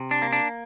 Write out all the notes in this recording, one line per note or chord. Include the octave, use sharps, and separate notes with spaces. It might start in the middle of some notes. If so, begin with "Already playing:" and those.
Already playing: C3
D4
A#3
D4